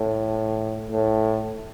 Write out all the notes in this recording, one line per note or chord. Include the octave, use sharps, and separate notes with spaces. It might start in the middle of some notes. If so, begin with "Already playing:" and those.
Already playing: A2
A2